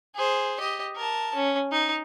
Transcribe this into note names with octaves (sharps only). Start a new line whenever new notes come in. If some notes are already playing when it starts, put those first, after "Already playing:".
G#4 C5
G4 D#5
A#4 A5
C#4
D#4